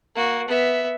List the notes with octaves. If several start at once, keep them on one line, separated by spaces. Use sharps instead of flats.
A#3 F#4
B3 E5